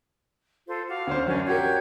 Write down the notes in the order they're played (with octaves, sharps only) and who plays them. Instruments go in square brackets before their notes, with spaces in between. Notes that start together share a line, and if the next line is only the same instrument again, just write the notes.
[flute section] F4 A4 C5
F#4 F5 D6
[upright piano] D2 C#4 C5
[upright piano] F#2 F#3 [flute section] C#4 D4
[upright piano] F#4 G4 A#4 [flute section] C#5 G6 G#6